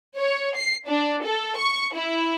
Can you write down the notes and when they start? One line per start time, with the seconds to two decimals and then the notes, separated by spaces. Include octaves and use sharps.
0.17 C#5
0.56 C7
0.87 D4
1.25 A4
1.57 C#6
1.95 E4